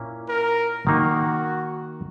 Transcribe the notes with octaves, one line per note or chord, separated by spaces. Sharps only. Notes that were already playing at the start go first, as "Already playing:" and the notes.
Already playing: A#2 A#3 C#4 E4
A#4
D#3 A#3 D#4 F#4